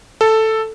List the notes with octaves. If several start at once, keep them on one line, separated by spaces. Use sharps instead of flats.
A4